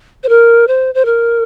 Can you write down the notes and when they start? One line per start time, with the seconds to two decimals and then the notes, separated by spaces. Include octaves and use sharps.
0.23 C5
0.29 A#4
0.67 C5
0.95 C5
1.05 A#4